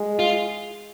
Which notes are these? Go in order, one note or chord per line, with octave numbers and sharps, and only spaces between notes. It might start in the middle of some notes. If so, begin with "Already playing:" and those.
Already playing: G#3
F4